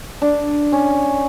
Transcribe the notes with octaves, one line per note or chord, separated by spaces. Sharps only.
D4
C#4